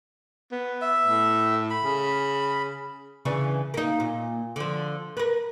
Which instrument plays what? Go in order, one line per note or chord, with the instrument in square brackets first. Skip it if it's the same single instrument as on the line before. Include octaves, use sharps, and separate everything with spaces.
[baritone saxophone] B3
[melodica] E5
[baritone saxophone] A2
[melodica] B5
[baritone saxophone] C#3
[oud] C#3 E3 D4
A#3 D#4
A#2
D3 F3
A#4 B4